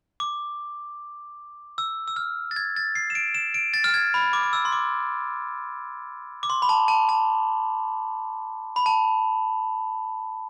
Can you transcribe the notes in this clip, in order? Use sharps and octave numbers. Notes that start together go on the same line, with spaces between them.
D6
E6
E6
F6
A6
G#6
A6
C7
E7
D7
E7
D7
A6
F6
G#6
B5
D6
D6
E6
C6
D6
D6
C6
B5
A5
A5
A5
B5
A5